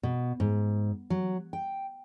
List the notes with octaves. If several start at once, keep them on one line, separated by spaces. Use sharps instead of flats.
B2
G#2
F#3
G5